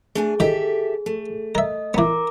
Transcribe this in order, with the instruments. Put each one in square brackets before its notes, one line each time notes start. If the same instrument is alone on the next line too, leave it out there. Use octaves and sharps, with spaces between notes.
[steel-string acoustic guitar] A3 D4 G#5 [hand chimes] G#4
[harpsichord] D#3 [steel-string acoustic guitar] G4 A4 E5
[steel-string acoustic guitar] A3
[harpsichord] A#4 E5 [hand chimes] D#5
[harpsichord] E3 B3 [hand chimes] A#4 A#5 D6